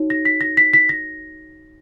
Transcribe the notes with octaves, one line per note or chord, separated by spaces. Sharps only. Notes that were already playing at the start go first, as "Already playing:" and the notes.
Already playing: D#4 F#4 C#5
A#6
B6
A#6
B6
B6
A#6